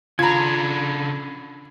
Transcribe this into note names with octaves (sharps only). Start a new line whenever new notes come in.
C#3 D4 F4 A#5 B5 G#6